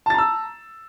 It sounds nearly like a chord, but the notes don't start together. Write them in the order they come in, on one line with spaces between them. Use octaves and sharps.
A5 A6 A#5 E6